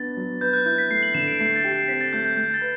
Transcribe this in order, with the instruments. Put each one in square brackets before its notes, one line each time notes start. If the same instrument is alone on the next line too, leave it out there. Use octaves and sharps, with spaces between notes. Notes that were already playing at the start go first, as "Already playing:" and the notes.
Already playing: [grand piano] B3 D4 [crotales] A6
[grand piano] F#3
[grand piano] B4 [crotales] G6
[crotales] F#6
[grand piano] E4 [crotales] G6
[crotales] B6
[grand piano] A3 [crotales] C7
[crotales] F#7
[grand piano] D3 [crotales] E7
[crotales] D7
[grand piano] A3 [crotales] C7
[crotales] A6
[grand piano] G4
[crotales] C7
[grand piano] C4 [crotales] B6
[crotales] A6
[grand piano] A3 [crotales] G6
[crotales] G6
[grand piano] A3 [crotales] G6
[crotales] A6
[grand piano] B4